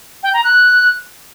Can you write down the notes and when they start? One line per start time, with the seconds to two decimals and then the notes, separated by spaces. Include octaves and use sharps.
0.23 G5
0.33 A#5
0.44 F#6